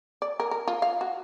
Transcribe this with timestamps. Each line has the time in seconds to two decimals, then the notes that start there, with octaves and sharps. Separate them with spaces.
0.22 D5
0.40 A#4
0.51 A#4
0.68 F4
0.82 F5
1.01 F#4